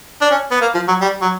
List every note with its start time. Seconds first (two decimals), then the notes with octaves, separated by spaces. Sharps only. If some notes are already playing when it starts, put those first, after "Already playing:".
0.21 D4
0.31 C#4
0.51 B3
0.61 A#3
0.75 F3
0.88 F#3
1.01 G3
1.22 F#3